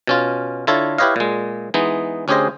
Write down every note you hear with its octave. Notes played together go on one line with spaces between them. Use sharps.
B2 C#4 F4
D3 E4 F4 A4 C#5
E4 G4 B4 C#5 D#5 F5
A#2 G#3
E3 G#3 B3 D#4
D2 C#4 G4 G#4 C5 D#5